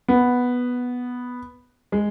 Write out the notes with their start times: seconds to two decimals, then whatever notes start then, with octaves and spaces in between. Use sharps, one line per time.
0.08 B3
1.92 G#3